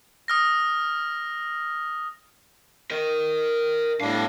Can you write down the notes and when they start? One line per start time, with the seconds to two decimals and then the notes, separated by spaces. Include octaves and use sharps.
0.28 D#6 F6 A#6
2.91 A#4 D#5
4.01 A2 G3 B3 D4 F5